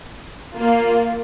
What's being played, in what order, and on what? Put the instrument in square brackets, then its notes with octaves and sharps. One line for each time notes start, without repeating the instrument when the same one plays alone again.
[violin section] A#3 F4